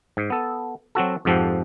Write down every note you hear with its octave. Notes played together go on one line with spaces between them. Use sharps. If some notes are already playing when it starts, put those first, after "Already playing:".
G#2
B3 A4
F#3 C4 F#4 A4
F2 G#2 F3 G4 A4 F#5